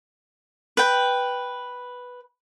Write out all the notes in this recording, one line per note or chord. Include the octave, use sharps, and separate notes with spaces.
B4 G5